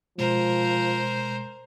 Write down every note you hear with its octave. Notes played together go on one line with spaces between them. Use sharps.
B2 F3 G#3 A#4 C5